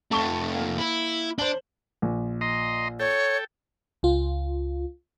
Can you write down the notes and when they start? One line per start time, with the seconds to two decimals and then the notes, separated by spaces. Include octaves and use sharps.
0.12 F2 A3 A5 C#6 G7
0.55 A#3
0.78 E4
1.39 D4 C5 F#7
2.02 A#1
2.41 D#5 A#5 C6
3.00 A4 C#5 G5
4.03 C#2 F4